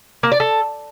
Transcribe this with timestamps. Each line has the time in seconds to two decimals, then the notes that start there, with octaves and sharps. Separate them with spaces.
0.23 A#3
0.32 D5
0.40 A4